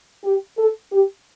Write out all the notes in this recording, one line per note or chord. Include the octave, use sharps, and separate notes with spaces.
G4
A4
G4